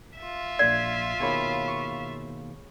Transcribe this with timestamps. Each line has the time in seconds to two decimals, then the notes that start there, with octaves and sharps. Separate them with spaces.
0.19 F4 E5
0.59 A#1 A#2 D5 C7
1.20 B2 D#3 A#3 G#4 C#5 B5
1.68 C#6